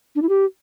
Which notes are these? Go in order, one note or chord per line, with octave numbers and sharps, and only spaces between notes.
D4
E4
G4